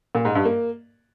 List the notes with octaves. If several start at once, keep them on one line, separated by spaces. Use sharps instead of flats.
A#2
G#2
G2
A#3